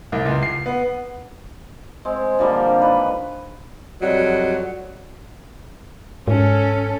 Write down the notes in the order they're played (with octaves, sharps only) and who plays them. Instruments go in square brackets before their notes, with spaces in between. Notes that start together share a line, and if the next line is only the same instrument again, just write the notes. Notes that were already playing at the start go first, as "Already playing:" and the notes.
[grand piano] C2
C#2
C7
B3
[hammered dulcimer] G#3 C4
D3 F3 G3 A#3
D#3 G#3 B4
[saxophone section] F2 F#3 G3 D#5 F#5
[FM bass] G#2 [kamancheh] C#4 A4